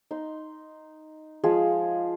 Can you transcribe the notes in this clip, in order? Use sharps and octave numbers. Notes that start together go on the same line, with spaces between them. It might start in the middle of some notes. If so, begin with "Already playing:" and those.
D#4 C6
F3 G#3 G#4 F5